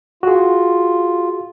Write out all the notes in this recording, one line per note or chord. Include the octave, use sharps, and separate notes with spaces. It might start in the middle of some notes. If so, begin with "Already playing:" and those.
F4 F#4 G#4